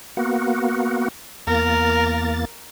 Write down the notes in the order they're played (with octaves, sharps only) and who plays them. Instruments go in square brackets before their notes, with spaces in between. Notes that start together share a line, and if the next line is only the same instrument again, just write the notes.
[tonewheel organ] A#3 B3 F#4
[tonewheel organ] E2 A#3 A6 [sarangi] A#4